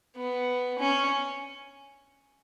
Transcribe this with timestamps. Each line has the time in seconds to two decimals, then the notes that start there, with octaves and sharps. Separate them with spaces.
0.17 B3
0.79 C#4